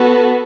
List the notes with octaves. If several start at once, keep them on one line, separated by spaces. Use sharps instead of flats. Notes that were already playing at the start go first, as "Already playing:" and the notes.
Already playing: B3 F#4 A4